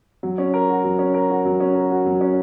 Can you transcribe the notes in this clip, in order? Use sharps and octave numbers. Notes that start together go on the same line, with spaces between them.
F#3
C#4
A#4
F#4
F#3
C#4
A#4
F#4
F#3
C#4
A#4
F#4
F#3
C#4